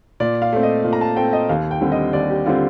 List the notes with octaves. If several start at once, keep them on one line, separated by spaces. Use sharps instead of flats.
A#2 D5
F5
A3 C4
D#5
A#2
A#5
A5
A3 C4 G5
D#5
D#2 F5
G5
D3 G3 C4
D#5
D#2 D5
G4
D3 G3 C4 F4